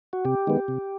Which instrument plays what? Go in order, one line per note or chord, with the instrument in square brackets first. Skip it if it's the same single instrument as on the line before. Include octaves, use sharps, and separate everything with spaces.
[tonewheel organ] F#4
C3 G4
D#3 G#3 B3
C3